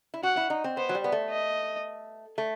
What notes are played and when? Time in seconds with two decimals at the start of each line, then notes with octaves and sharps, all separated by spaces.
0.14 E4
0.23 F#4 F#5
0.37 E4
0.50 D#4
0.64 C4
0.77 B3 C5
0.89 F#3
0.95 G3
1.04 B3
1.12 A3
1.30 D#5
2.38 A3